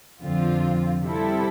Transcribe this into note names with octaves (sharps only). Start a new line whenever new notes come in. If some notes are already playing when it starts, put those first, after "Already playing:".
F2 D3 F3 C4 F4
C3 G3 C4 E4 A4